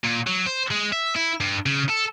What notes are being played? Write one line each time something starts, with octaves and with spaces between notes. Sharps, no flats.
A#2
F#3
C5
G#3
E5
E4
G2
C#3
A4